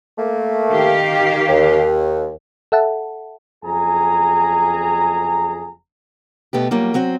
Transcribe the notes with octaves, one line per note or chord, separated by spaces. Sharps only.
A3 A#3
D#3 G4 F5
D#2
A4 E5 F#5 A5
F#1 F2 G#4 G#5 A#5
B2 A3 B3 G4
F#3 G3 A#3 F4
F#3 C4 F#4